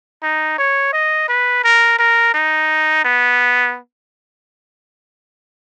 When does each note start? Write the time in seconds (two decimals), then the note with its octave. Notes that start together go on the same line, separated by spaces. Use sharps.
0.23 D#4
0.58 C#5
0.93 D#5
1.29 B4
1.64 A#4
1.99 A#4
2.34 D#4
3.05 B3